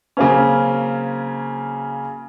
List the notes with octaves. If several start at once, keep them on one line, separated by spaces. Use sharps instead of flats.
C#3 F#3 A#3 C4 C#4